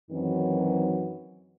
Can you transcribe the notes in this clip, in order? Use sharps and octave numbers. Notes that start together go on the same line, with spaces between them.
F#2 D#3 E3 F#3 C4 D#4